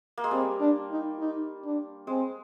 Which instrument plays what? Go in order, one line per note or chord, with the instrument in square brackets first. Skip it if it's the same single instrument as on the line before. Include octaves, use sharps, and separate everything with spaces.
[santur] A#3
G#3
[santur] G3 [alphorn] C4
[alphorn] D4
D#4
D#4
D4
[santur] G#3 [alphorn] C4